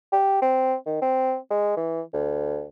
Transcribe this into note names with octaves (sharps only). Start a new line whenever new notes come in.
G4
C4
D#3
C4
G#3
E3
D2